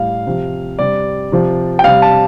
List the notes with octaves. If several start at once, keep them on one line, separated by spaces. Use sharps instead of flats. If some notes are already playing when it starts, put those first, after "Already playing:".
Already playing: A2 G3 F5
C3 F3
C3 G3 D5
C3 F3
G5
C3 G3 F5
A5